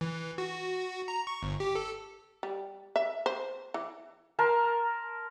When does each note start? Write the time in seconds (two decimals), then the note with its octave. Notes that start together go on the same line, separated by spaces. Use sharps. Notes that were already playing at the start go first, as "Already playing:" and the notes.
0.01 E3
0.38 F#4
1.08 A#5
1.27 C#6
1.42 G1
1.60 G4
1.75 A4
2.43 G3
2.96 E5
3.26 C5
3.74 E3
4.39 A#4 A5 C6